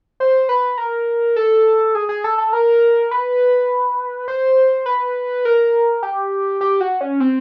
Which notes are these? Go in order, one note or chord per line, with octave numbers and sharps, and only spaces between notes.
C5
B4
A#4
A4
G#4
G#4
A4
A4
A#4
B4
C5
B4
A#4
G4
G4
F#4
C#4
C4